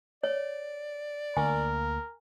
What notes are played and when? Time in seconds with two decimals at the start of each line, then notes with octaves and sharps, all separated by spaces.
0.24 C#5 D5
1.37 D2 A#3 A#4 G#5